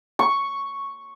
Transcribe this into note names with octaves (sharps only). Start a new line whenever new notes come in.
C#6